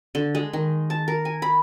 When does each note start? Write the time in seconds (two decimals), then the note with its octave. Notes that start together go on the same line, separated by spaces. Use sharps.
0.15 D3
0.35 G#3
0.53 D#3
0.90 A5
1.08 A#4
1.25 G#5
1.42 B5